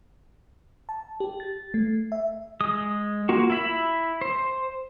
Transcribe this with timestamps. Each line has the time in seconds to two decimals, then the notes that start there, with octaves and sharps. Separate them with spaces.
0.89 A5
1.20 G4
1.40 A6
1.74 A3
2.12 E5
2.61 G#3 D#6
3.29 A#3 F4 F#4
3.50 E4 E5 B5
4.21 C5